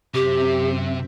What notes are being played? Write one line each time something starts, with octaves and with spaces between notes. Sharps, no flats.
F#2 C3 C4 G4 E5